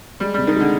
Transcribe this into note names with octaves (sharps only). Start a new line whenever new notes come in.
G3 G#3
C3 G3
D#3
D3 G#3